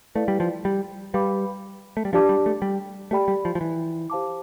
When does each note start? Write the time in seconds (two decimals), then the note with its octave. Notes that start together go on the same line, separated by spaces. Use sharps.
0.15 A3 E4 B4 D5 F5
0.28 G3
0.40 F3
0.65 G3
1.13 G3 B4 F5 B5 D6
1.97 A3
2.05 G3
2.13 F3 D4 G4 D5 A5 D6
2.29 G3
2.46 A3
2.62 G3
3.11 A3 G4 D5 G5 B5
3.28 G3
3.45 F3
3.55 F3
3.61 E3
4.10 G4 C5 F5 A5 D6